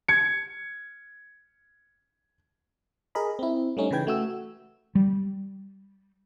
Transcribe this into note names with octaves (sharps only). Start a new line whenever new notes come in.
G#6 C#7
G#4 A#4 D#5 B5
C4 E4
G3 A3 C#4 D#4
C#3 E3 B4 G5 G#6
A3 F#4 E6
G3